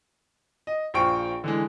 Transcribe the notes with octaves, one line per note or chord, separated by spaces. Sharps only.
D#5
A#1 F4 C5 G5 C#6 D7
D3 E3 G#3